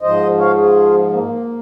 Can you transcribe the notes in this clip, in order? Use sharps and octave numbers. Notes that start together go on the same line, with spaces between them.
G#2 F3 C5 D#5
C#5 F5
F4 G#4
A#3